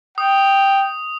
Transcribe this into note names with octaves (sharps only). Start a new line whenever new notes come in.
G5 D#6